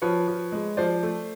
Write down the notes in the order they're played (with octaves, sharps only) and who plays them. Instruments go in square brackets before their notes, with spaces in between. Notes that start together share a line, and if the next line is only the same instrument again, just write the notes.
[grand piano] F3 B4 C#5
F3
G#3
F3 C5 D5
A3